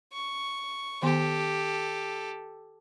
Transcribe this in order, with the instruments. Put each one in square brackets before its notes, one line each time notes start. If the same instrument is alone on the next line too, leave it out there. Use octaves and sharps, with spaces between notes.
[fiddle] C#6
[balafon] D#3 B3 C6 [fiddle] G4 A4